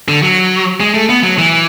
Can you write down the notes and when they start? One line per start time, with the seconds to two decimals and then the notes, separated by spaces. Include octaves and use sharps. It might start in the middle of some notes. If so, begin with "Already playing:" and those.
0.08 D3
0.23 F#3
0.80 G#3
0.94 A3
1.09 B3
1.23 F#3
1.38 E3